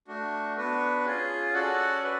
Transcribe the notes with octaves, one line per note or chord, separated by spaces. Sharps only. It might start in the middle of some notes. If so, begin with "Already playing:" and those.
A3 D4 F#4
B3 D4 F#4 B4
C#4 F4 G#4
C#4 F#4 A4 D5 F#5
F#4 B4